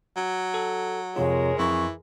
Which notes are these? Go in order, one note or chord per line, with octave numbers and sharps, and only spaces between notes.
F#3
A4
F2 C3 G#3 F4 A#4 C#5
F2 E3 C#6